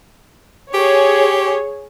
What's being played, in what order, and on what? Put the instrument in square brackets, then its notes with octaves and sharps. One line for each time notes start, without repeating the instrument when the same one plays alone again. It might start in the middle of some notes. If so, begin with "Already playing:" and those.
[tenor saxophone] G4 [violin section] G#4 C#5